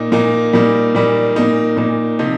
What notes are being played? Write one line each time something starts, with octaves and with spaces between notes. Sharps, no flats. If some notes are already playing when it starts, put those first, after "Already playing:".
Already playing: A#2 A#3 D#4
A#2 A#3 D#4
A#2 G3 A#3 D#4
A#2 G3 A#3 D#4
A#2 A#3 D#4
A#2 A#3 D#4
C3 F3 D#4